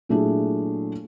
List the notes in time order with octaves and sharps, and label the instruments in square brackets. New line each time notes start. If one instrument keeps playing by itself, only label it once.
[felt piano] A#2 F#3 A3 D4 E4 G#4